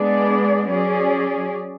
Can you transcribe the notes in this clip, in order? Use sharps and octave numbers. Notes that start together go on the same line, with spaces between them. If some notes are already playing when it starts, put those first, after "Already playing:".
Already playing: G#3 B3 D4 G#4 D5
F#3 C#4 G#4 D5